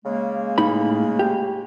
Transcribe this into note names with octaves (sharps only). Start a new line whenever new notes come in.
C#3 G#3 A#3
A2 D#4 B5
G4